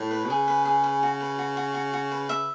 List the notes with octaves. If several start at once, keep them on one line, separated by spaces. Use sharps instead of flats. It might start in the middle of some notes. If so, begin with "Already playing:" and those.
Already playing: A2
B4
B2
C#3 G#4
B4
G#4
B5
F#4
B4
F#4
F#4
F#4
F#4
B4
E5